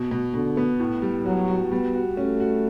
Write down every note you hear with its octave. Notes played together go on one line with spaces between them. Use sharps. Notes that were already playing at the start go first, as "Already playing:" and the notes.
Already playing: B2
B2
B2 D3
B3
A2
G3
F#3 F#4
F#4
G3 B3
F#4
A3 C#4
F#4